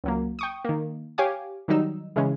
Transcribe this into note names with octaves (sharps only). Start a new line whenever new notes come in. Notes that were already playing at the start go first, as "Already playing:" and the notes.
C#2 F#3 A#3
G5 C#6 D#6
D#3 A#3
G4 C#5 F5 G#5 D6
D#3 F#3 G3 D#4 E6
C#3 E3 G#3 C#4